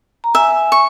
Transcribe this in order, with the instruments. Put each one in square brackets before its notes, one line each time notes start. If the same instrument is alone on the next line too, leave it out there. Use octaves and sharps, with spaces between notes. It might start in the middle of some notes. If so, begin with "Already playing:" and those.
[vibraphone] A#5
[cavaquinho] E5 [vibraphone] G#5
[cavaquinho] C#6